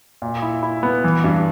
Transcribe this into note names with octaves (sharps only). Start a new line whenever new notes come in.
A#2
E4
E4
B3
E3
G2